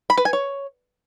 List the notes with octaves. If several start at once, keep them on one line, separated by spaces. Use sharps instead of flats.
B5
B4
G#5
C#5